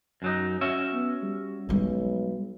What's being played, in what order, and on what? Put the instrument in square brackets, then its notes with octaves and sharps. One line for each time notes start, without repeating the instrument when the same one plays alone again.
[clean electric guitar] F#2 F#3 D#4
C#4 F#4 E5
[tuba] B3
G3
[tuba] B1 [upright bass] G3 G#3